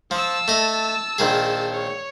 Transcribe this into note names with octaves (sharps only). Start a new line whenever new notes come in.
F3 A5 E6
A3 D#5
A#1 D#3 G#4
C#5